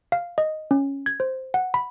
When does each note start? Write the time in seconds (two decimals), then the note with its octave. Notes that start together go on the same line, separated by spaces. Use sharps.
0.12 F5
0.38 D#5
0.71 C#4
1.06 G#6
1.20 C5
1.54 F#5
1.74 B5